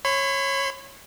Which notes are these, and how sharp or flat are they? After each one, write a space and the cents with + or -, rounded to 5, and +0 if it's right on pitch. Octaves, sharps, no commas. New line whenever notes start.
C#5 -20 B5 +35